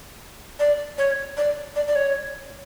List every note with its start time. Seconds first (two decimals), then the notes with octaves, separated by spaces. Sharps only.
0.60 D5
0.98 C#5
1.37 D5
1.76 D5
1.87 D5
1.95 C#5